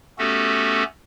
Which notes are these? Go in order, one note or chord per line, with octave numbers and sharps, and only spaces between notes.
A3 B3 C#4 F#4 G4 A4